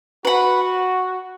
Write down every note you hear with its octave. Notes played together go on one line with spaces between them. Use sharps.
F#4 B4 F#5 B5